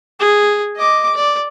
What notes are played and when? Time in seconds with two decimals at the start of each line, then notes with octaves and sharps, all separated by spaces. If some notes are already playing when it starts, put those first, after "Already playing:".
0.20 G#4
0.76 D#5 D6
1.15 D5